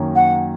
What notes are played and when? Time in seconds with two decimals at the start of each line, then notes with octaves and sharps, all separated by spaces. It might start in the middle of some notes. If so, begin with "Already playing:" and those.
Already playing: F#2 D#3 A#3 C#4
0.16 F#5